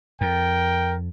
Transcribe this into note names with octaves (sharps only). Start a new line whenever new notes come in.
F2 A#4 G5